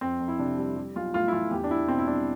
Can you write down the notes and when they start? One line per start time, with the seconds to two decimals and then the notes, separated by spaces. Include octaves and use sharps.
0.01 F2 C4
0.20 F2
0.28 E4
0.39 C3 D4
0.58 G3
0.76 G3
0.96 B1 F4
1.13 A2 F4
1.28 E4
1.32 E3 F4
1.51 E2 G4
1.64 D4
1.71 E2 E4
1.88 B2 C4
1.98 E4
2.07 G3 D4